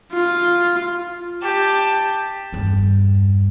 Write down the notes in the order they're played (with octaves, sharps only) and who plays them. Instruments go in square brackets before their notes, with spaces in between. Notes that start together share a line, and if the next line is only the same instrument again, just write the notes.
[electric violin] F4
[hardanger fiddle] G4 A5
[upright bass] E2 G2